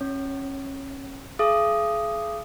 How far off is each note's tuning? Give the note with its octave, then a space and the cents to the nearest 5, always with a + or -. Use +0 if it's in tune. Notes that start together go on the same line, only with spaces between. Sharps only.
C#4 -25 C#5 +0
G#4 +35 F5 -45 D#6 +0